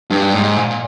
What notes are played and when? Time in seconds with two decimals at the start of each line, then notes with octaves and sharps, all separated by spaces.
0.10 G2
0.34 G#2
0.57 A#2